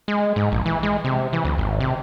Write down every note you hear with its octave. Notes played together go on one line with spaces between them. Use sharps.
G#3
G#2
A#1
E3
G#3
C3
E3
D2
G#1
C3